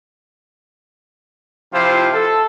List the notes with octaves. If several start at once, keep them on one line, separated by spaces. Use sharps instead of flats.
C3 F3 E4 F4 G4 C5
A4